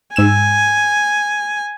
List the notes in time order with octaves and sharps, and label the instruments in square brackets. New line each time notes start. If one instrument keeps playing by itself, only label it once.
[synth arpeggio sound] G#2 E6 E7 [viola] G#5